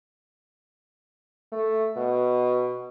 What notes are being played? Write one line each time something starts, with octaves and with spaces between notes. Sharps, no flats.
A3
B2